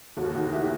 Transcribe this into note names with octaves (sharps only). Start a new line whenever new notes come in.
D#2 F#4
D#3 F#4
A3 E4 G4